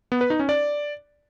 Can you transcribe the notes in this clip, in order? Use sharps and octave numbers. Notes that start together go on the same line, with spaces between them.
B3
B4
D#4
C#4
D5